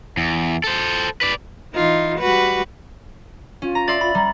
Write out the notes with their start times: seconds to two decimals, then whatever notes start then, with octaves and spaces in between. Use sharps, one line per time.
0.17 E2
0.64 A4 C5
1.21 B4 D5
1.74 E3 D#4 F4
2.19 G3 F#4 B4
3.62 C#4 F4
3.75 A#5
3.88 D5 E5 C6 A6 F#7
4.01 F4 B5
4.15 G3 A#5